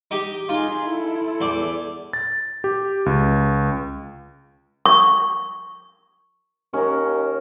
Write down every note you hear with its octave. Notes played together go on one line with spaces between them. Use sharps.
D#4 G4
D#4 F4 G#4
E4 A4
E2 D5
A6
G4
C#2
C#6
D#2 C#4 A#4